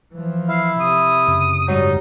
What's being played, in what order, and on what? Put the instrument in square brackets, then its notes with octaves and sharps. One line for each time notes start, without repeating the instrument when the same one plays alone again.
[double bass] E3 F3
[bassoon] E4 [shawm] F5
[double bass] C3 [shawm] D#6
[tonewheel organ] F#2 C#3
[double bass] G#2 G3 [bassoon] F#3 [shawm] D#4